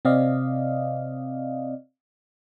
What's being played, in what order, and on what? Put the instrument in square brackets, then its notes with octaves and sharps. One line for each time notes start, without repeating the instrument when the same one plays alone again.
[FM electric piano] C3 C4 D5 D#5 F5